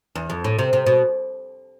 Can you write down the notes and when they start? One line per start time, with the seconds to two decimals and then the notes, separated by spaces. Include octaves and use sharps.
0.15 E2
0.30 F2
0.44 A2
0.59 C3
0.73 C3
0.86 B2